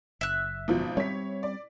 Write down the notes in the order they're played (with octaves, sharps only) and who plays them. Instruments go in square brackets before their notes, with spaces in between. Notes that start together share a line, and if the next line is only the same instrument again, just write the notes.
[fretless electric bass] F#1 [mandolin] E5 F#6
[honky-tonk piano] G#1 B2 F3
[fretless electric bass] G3 C4 [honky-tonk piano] C#5 B6
[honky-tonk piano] D5